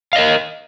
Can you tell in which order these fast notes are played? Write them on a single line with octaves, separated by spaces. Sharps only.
F5 D#5 A#4